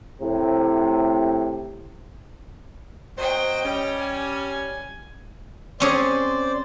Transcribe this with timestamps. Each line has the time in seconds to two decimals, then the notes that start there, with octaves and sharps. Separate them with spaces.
0.21 A2 C3
3.17 F#3 C4 C5 D#5 G5
3.64 G3 C#4
3.98 G#5
5.80 C4 C#4 G#4 C5 D5